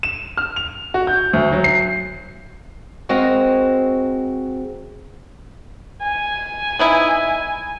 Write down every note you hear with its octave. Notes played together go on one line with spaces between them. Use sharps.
E7
F6
F7
F#4
G6
D2
F#3
C7
G#3 C4 F#4 A#4 A#5
G#5
B3 D#4 E4